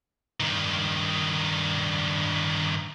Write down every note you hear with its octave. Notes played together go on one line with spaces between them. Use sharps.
G2 D#3